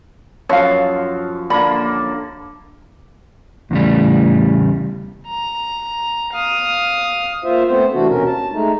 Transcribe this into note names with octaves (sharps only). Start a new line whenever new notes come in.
F#2 F3 C#5 F5
D3 A#3 B5
E2 A2 C#3 G3
A#5
F5 D#6
A#3 F4 C5 E5
A3 B3 C4 C5
C3 E3 A3 D4 F#4
D#2 B2 C#4 A#4
A5
G#3 A3 D#4